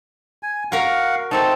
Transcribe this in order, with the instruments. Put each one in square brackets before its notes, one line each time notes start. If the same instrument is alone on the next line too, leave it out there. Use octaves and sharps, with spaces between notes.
[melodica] G#5
[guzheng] F#4 A#4 A#5 [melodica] F5 F#5
[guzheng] A3 C4 D#4 [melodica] A5